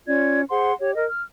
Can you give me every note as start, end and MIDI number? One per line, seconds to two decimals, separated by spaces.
0.07 0.41 61
0.07 0.41 65
0.07 0.41 74
0.07 0.41 92
0.49 0.73 68
0.49 0.73 72
0.49 0.73 78
0.49 0.73 84
0.79 0.94 67
0.79 0.94 73
0.95 1.04 70
0.95 1.04 75
1.10 1.23 89